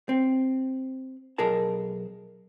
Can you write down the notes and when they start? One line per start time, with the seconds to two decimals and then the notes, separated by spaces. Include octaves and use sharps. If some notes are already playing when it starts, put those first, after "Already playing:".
0.09 C4
1.38 B1 B2 G#4 A#4 A5